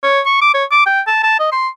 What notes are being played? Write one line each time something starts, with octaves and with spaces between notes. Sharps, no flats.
C#5
C#6
D6
C#5
D6
G5
A5
A5
D#5
C6